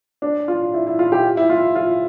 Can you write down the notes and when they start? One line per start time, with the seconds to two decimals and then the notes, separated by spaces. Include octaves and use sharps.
0.22 D4
0.48 F4
0.74 E4
0.87 E4
0.99 F4
1.12 G4
1.37 E4
1.50 F4
1.75 F4